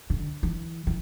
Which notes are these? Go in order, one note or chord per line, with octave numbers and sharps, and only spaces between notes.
D3
E3
E3